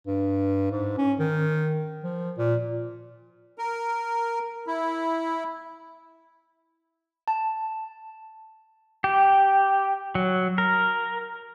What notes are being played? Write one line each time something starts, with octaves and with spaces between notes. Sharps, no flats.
G2
G#2
C#4
D#3
F3
A#2
A#4
E4
A5
G4
F#3
A#4